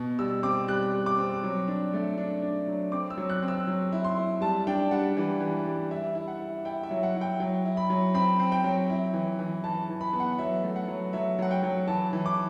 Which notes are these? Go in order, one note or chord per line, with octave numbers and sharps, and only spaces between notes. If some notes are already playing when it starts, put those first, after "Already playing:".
Already playing: B2
G3 E6
C4 D6
G3 F#6
G3
D6
C4
F#3
D4
A3
D4
D4
F#3
C4 D6
E6
F#3
F#6
C4
E6
F#3
E4
C6
E4
G3 A5
D4 G5
G3 F#5
E3
E3
G3
E4 E5
E4
F#5
E4
E4 G5
E5
F#3
F#5
E4
G5
F#3 G5
E4
B5
F#3
C4 B5
C4
G5
F#3
E4
E3
E3
E3 A5
E3
B5
B3
F#5
F#3 E5
A3
F#5
F#3
F#3 E5
F#3 F#5
G5
F#3
E3 A5
E3
D6